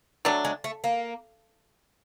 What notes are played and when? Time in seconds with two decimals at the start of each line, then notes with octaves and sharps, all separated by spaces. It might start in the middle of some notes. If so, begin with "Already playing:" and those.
0.25 F#3 G3 A3 D4
0.45 G#3
0.64 A3
0.84 A#3